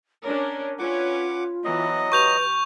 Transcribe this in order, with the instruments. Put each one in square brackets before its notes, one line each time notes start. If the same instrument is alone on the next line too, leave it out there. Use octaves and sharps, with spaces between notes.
[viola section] C#4 D4 A#4 [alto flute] C#5
[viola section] C#4 B4 C#5 [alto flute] F4 [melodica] F#5 D6
[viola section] E3 B3 [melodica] F#3 D#5
[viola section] G4 [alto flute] B4 [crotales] C#6 G6 F7